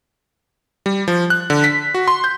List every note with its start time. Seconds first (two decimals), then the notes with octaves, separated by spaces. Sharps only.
0.86 G3
1.08 F3
1.30 F#6
1.50 D3
1.64 B6
1.94 F#4
2.08 C6
2.24 G6